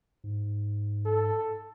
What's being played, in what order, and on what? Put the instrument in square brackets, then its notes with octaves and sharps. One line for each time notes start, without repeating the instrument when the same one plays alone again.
[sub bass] G#2
[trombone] A4